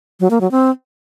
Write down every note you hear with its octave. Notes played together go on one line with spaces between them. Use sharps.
F#3
A#3
F#3
C4